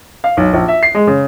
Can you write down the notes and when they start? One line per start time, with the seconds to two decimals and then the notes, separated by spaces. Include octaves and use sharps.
0.24 F5
0.37 B1
0.53 A#1
0.68 E5
0.83 C7
0.95 G#3
1.07 C#3